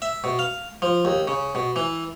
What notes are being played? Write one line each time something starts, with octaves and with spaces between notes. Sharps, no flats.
E5
B2
F5
F3
D#2
C#3
B2
E3